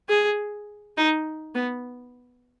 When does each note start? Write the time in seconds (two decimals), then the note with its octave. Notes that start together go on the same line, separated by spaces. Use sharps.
0.09 G#4
0.97 D#4
1.55 B3